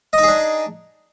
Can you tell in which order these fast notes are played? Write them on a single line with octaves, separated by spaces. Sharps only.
D#5 D#4 G#4 D4